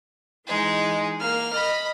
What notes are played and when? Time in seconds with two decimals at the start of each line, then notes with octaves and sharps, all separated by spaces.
0.47 E3 G#3 D#4 G#4
1.19 A#3 F6
1.53 D#5 B5